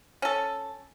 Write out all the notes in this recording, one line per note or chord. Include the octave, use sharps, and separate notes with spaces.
C#4 A4